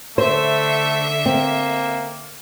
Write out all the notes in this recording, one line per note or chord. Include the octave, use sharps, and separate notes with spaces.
D3 A3 C5 E5
A#3 C4